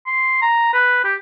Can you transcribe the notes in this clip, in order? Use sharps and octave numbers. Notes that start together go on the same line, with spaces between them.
C6
A#5
B4
G4